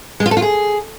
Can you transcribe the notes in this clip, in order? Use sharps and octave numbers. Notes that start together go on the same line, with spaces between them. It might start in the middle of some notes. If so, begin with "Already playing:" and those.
G#3
F4
A4
F4
G#4